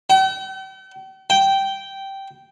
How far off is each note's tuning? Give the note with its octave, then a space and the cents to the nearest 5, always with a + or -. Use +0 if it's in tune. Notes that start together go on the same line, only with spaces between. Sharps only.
G5 -45
G5 -10